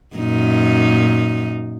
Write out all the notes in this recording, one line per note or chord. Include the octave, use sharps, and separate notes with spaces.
F#2 A#2 D#4